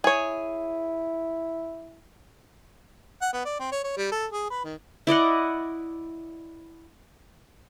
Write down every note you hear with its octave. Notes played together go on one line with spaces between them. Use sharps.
E4 G#4 C#5
F#5
B3
D5
C4
C#5
C#5
G3
A4
G#4
B4
D#3
E4 D5 D#5 F#5